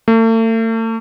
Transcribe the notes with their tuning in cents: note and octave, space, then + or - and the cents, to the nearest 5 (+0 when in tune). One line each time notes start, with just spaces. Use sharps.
A3 +40